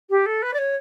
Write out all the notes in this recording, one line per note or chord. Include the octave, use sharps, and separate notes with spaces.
G4
A4
B4
D5
C#5